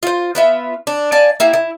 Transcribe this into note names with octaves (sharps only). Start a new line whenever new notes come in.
F4 C5
B3 F4 E5
D4
D5 F5 G#5 A5
A#3 E4 G4
E4